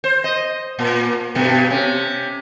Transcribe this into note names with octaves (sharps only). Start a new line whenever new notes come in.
C5
D#5
A#2
G2 B2 A3
C3 C#4